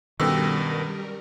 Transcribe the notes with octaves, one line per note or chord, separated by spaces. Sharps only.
G2 B2 D#3 G3 C#4 A4 A#4 E6